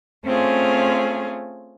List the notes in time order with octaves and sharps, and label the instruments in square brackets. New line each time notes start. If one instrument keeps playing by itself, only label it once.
[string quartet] A3 C4 C#4 F4 G#4